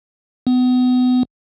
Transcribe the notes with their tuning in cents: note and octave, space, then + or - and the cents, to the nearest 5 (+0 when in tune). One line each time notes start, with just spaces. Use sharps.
B3 +30